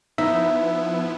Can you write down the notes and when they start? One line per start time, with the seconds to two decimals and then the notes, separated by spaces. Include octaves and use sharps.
0.18 F3 B3 D#4 E4 E5